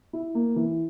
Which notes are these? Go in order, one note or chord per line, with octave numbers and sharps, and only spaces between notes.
E4
A#3
E3